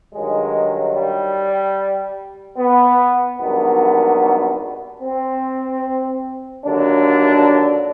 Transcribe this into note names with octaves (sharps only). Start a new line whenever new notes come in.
G2 D#3 F#3 G#3
G3
B3
G#1 G2 D#3 F#3 B3
C4
D#2 D3 F#3 D4